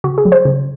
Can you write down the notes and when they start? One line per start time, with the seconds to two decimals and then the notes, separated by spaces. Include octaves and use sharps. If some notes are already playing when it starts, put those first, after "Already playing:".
0.04 C#3 F#4
0.18 G#4
0.25 F#3
0.32 C5
0.45 C#3